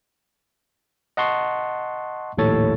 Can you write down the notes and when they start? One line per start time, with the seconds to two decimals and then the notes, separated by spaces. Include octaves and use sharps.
1.17 D#5 F#5 A5 C6 C#6
2.38 A#1 D#2 A2 A4 C#5 A6